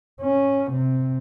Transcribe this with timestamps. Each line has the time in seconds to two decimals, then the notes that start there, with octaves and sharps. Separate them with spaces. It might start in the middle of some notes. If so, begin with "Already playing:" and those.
0.22 C#4
0.71 C3